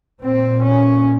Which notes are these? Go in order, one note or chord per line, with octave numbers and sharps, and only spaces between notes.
A#2 C4
C#4